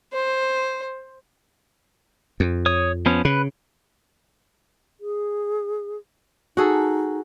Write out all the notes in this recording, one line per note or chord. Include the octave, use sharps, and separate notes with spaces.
C5
F2
C#5 D#6
F3 B3 C#4
C#3 B4
G#4
D#4 F#4 G#4 A4